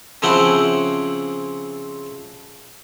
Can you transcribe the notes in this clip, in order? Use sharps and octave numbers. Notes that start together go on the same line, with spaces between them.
C#3 F3 C4 E4 F#5 G5